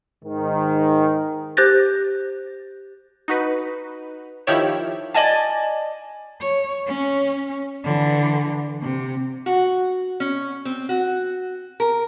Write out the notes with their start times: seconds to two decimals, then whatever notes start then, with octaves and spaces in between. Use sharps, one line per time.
0.23 G#2 D#3
1.57 G4 C5 F#6 G6 A6 A#6
3.28 D#4 F#4 B4
4.47 D#3 F3 E4 G4 C#5 E7
5.14 D5 D#5 G#5 A5
6.41 C#5
6.88 C#4
7.84 D3 E3
8.82 C3
9.46 F#4
10.20 C#4
10.65 C4
10.89 F#4
11.80 A#4